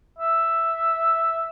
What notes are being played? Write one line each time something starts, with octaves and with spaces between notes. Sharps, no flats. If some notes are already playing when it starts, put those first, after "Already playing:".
E5